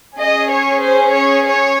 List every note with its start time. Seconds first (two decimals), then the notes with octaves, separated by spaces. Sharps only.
0.19 C#4 G#4 D#5
0.51 C#5
0.82 C5
1.14 C#5
1.44 C#5